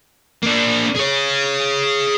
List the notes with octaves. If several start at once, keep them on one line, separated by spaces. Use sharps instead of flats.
A#3 D4
G#4 C#5